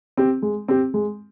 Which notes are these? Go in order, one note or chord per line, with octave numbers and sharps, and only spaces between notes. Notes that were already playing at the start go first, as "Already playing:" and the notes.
C4 G4
G#3
C4 G4
G#3